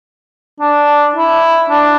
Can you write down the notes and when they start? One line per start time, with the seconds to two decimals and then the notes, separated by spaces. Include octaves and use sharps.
0.60 D4
1.15 E4
1.69 D4